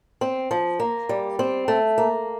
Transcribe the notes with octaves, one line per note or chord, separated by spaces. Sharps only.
C4
F3
A#3
G3
C4
A3
A#3